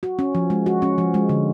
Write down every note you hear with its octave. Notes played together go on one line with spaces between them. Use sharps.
F#4
C#4
F3
G#3
F#4
C#4
F3
G#3
D3